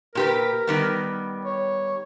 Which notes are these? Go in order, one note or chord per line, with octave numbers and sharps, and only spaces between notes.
A#2 G4 A#4 B4
D#3 G3 B3
C#5